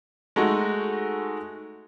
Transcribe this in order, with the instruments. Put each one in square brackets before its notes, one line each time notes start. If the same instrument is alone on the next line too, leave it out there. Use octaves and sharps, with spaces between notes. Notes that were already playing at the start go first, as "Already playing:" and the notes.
[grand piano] G#3 A3 D#4 F#4 A4